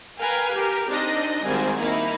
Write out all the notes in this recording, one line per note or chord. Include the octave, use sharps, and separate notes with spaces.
A#4 B4 F5 G5 G#5
G4 A#4
C4 D4 D#4 D#5
G#1 D#3 G3 C4 G#5
A#3 D#4 E4